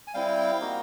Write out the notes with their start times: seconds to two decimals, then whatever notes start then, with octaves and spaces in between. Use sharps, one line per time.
0.07 G#5
0.14 G3 C4 E4 F5 G5
0.60 A#3 D#4 F#4